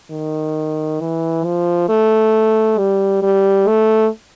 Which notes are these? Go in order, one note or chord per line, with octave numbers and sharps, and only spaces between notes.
D#3
E3
F3
A3
G3
G3
A3